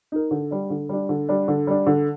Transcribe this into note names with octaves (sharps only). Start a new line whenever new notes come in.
D#4 A#4
D3
G3 D4
D3
G3 D4
D3
G3 D4
D3
G3 D4
D3